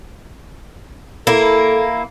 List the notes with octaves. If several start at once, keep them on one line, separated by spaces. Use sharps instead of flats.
A#3 E4 A4